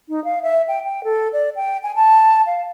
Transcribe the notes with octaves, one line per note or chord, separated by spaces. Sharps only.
D#4
F5
E5
G5
G5
A4
D5
G5
G#5
A5
F5